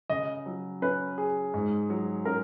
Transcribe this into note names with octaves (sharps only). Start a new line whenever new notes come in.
C#3 D#5
F#3
C#4 B4
G#4
G#2
F#3
C#4 A#4